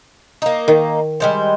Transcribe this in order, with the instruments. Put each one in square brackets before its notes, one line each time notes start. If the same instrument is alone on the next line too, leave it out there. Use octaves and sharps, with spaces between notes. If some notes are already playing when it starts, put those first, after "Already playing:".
[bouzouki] A#3 D#4
[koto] D#3
[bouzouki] G3 G#3 C5